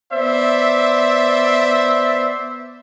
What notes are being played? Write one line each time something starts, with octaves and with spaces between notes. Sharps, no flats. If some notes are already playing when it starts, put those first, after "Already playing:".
B3 C5 D5 E5